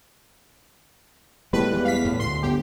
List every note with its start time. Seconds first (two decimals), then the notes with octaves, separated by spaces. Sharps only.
1.53 A2 G3 G#3 B3 B4
1.71 E2
1.85 F5 B6
2.05 A2
2.20 D2 C6
2.43 G1 G4